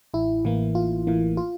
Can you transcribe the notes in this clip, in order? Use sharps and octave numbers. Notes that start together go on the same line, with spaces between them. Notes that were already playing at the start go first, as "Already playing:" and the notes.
A1 E4
A2 E3 A#3
A1 F4
A2 E3 A#3
F4